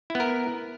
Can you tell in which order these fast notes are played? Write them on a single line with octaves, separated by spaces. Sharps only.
E4 B3 A#4